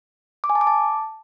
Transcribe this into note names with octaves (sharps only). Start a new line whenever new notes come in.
D6
G#5
A5
D6
A5